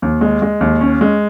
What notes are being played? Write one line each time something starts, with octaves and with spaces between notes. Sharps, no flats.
D#2
G#3
G#3
D#2
C#4
G#3